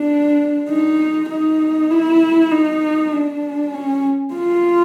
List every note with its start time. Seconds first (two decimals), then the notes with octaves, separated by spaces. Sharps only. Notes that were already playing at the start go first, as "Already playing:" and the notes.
Already playing: D4
0.69 D#4
1.30 D#4
1.91 E4
2.52 D#4
3.12 D4
3.74 C#4
4.34 F4